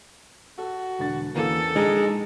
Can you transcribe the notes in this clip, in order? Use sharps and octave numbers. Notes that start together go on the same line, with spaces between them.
F#4 A4
E1 D3 A6
E2 A#3 C#4 A4 D#7
A#1 G#3 D#4 A#5